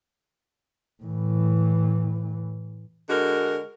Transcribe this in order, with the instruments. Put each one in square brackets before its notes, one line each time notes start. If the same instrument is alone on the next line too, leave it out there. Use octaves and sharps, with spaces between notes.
[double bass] A2 E3
[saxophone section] D3 G#3 F#4 A#4